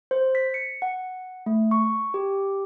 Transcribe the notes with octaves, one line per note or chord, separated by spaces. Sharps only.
C5
B6
C#7
F#5
A3
C#6
G4